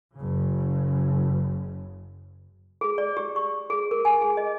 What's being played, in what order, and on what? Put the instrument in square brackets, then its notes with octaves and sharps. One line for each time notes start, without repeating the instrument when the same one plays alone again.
[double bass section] F#1 C#3
[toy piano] G#4
D5
G4
C#6
G#4
A#4
G#5
G#4
D#5